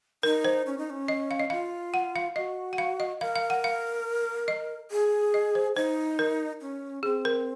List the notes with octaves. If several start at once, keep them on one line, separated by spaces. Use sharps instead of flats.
D#4 A#4
C5
C#4
D#4
C#4
D#5
F5
D#5
F4 F5
F#5
F5
F#4 D#5
F#5
F5
D#5
A#4 F5
F5
F#5
F5
D#5
G#4
D#5
C5
D#4 C5
A#4
C#4
C4 G#4
A#4